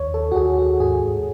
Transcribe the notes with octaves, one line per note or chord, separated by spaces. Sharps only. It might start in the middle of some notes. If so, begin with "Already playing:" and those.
Already playing: D#2 C#5
A4
F#4
D#2 G#4
F#4
G#2 G#4